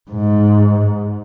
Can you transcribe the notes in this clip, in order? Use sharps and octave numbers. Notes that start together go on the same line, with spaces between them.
G#2